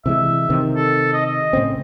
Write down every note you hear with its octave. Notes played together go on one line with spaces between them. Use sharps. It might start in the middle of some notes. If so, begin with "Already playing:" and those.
C3 E3 G#3 E5
C3 D#3
A4
D#5
D#5
A2 C#3 C4